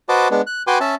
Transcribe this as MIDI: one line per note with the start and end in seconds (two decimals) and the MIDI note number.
0.09 0.28 66
0.09 0.28 71
0.09 0.28 72
0.09 0.28 75
0.09 0.28 81
0.09 0.28 86
0.31 0.42 56
0.31 0.42 59
0.31 0.42 62
0.47 0.63 90
0.67 0.78 66
0.67 0.78 71
0.67 0.78 79
0.67 0.78 80
0.67 0.78 84
0.67 0.78 86
0.80 0.95 61
0.80 0.95 76
0.80 0.95 81